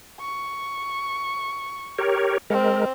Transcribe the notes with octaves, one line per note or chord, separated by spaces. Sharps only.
C#6
G4 A#4 C#5
G#3 C4 A#4